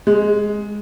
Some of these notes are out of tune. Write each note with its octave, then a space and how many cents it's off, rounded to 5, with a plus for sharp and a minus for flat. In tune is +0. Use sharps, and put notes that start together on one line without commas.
G#3 +0